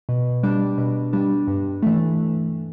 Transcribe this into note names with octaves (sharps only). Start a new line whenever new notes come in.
B2
G3 D4
B2
G3 D4
G2
E3 A3